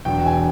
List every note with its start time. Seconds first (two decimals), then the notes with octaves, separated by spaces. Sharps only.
0.05 E1 G5
0.26 G#5